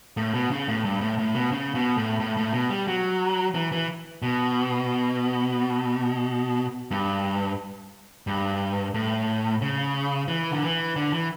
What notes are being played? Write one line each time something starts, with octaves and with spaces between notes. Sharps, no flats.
A2
B2
C#3
A2
G2
A2
A2
B2
C#3
B2
A2
A2
A2
B2
G3
F#3
E3
E3
B2
G2
G2
A2
C#3
E3
D3
E3
D3
E3